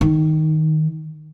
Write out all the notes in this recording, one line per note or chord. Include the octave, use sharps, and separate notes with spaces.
D#3